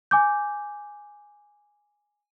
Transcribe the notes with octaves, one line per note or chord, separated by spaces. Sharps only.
G#5 D6 G6